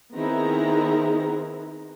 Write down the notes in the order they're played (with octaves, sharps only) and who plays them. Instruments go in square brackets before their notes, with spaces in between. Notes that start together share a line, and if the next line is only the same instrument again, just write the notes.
[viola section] D#3 B3 C4 E4 G#4 A#5